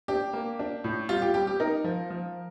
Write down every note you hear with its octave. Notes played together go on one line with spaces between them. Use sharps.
D4 G4
A#3
D4
A2
G3 F4
G4
G3 G4
G4
D#4 A#4
F3
F3